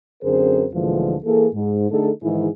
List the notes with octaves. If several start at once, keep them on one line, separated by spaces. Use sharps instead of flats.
F#2 D3 C4 G#4 A#4 C5
D2 A#2 D3 E3 F3 G#3
E3 A#3 G#4 A4
G#2
D3 A3 D#4 G#4 A4
G#2 D#3 E3 E4 G#4